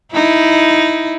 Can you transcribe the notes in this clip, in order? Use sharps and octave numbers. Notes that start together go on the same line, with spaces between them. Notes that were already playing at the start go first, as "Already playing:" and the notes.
D#4 E4